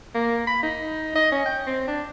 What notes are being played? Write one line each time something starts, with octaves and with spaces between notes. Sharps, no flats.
A#3
B5
D#4
D#5
C#4
G5
C4
D4